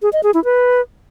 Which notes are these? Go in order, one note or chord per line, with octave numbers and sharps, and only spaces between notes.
G#4
D#5
G#4
E4
B4